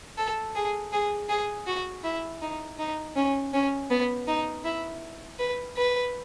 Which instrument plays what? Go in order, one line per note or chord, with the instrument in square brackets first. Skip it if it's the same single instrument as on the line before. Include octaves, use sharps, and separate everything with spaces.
[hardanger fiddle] A4
G#4
G#4
G#4
F#4
E4
D#4
D#4
C#4
C#4
B3
D#4
E4
B4
B4